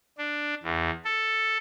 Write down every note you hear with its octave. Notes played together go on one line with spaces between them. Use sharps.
D4
E2
A4